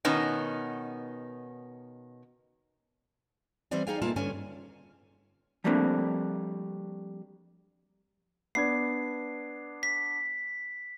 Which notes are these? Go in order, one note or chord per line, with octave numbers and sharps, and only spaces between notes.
B2 D#3 B3 C#4 D#4
E3 G3 B3 C4 D5 G#5
D#4 G#4 D5 F5 G5 G#5
B2 A3 A#3 F4 G#5 A5
G2 D3 C#4 G#5
F3 G3 A3 A#3 C4 D4
B3 D4 G#6 C7
B6